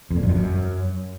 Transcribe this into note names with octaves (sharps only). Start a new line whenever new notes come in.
F2
A#2
F#2
F2
F#2